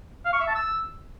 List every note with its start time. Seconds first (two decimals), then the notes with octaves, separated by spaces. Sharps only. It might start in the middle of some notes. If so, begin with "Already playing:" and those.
0.25 F5
0.32 C#6
0.40 E5
0.47 A5
0.55 E6